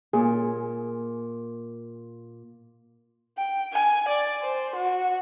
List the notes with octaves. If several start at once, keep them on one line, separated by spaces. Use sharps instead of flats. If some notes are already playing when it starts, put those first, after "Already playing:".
A#2 G#4
G5
G#5
D5
C5
F#4